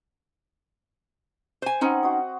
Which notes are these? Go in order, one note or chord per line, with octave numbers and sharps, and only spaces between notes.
C5 G#5
C4 C#4 D#4 B4 F#5
F#4 C5 D#5